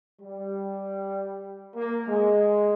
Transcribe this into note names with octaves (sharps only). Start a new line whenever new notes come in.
G3
A#3
G#3